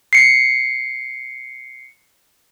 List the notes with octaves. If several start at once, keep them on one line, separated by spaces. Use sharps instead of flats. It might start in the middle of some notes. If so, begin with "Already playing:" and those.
C7 C#7